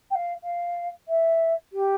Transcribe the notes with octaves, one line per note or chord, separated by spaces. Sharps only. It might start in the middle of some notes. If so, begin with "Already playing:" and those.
G5
F5
F5
E5
G4